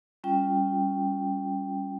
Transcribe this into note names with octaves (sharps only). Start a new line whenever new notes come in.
G3 C#4 F4 G5